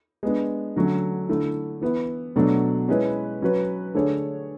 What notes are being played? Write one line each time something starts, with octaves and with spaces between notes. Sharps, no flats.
G#3 B3 D4
D3 F#3 A3 C#4
D3 A3 E4
E3 B3 E4
B2 F#3 A3 D4
G#3 C#4 E4 B4
F#3 C#4 F#4 B4
D3 A3 D4 G#4 C#5